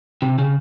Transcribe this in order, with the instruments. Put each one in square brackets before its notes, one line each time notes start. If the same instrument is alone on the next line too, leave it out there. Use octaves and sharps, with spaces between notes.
[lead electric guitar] C3
C#3